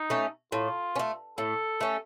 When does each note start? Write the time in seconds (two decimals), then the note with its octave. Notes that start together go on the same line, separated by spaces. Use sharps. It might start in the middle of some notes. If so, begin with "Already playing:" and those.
Already playing: D#4
0.10 A3 C#4
0.52 A2 F4
0.96 C#4
0.99 A3
1.38 A2 A4
1.81 A3 C#4